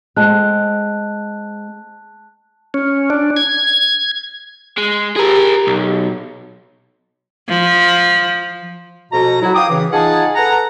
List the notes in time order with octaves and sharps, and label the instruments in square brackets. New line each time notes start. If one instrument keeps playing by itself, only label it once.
[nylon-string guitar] G#3 C4 [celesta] A5 F#6
[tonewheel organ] C#4
D4
G#6
[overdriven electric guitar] G#3
[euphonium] G4 [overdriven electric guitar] G#4 A#4
[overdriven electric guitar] B1
[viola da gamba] F3
[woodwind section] F2 B2 A#5
F#3 E4
F5 G5 D6 D#6
C#3 E3
D#4 F4 G#4 F#5 G#5 A5
A4 B4 F#5 A#5